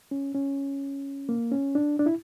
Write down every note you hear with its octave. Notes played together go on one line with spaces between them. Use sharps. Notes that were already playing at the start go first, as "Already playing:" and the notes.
C#4
C#4
A#3
C#4
D4
D4
E4